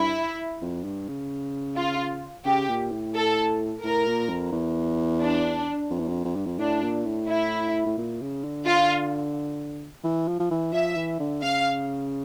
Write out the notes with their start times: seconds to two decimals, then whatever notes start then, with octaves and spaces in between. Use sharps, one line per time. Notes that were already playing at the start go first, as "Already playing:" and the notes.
Already playing: G2 E4
0.62 F2
0.84 G2
1.08 C#3
1.77 F4
2.45 C#3 G4
2.69 A#2
2.91 A2
3.15 A4
3.84 A2 A#4
4.07 A#2
4.29 F2
4.52 E2
5.22 D4
5.90 F2
5.99 E2
6.08 F2
6.25 F2
6.36 G2
6.46 F2
6.59 A2 D4
6.83 A#2
7.05 A2
7.29 E4
7.86 A2
7.98 A#2
8.21 C#3
8.44 D3
8.67 F4
10.04 E3
10.28 F3
10.40 F3
10.51 E3
10.73 F3 E5
10.97 E3
11.20 D3
11.42 C#3 F5